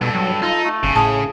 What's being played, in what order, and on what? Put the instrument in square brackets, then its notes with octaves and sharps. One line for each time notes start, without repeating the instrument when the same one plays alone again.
[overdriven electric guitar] G2 [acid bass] B2 [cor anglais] A4
[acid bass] F#3
[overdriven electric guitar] D#4 [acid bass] F4
[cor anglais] A3
[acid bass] G1 [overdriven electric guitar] C#3
[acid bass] A2 [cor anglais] G#4 [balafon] A5